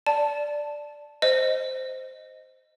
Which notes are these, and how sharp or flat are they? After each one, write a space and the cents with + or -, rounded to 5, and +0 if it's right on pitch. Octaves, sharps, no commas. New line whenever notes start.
D5 +0 A5 +0
C5 -5 D#5 +0